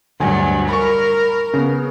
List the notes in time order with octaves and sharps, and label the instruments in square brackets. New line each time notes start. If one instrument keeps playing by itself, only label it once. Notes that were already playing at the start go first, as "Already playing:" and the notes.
[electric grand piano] D2 G#5 [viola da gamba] G2 F#3
[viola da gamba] A#4 [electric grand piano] B5 C#6
[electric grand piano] C#3 B3